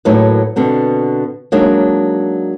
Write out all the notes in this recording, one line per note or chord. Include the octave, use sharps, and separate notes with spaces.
A2 F#3 A#3 D#4 B4
B2 D3 C4
F#3 G#3 A#3 D4 D#4